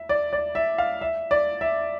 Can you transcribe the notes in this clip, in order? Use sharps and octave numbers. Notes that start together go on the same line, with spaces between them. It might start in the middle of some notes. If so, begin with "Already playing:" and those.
Already playing: E5
D5
D5
E5
F5
E5
D5
E5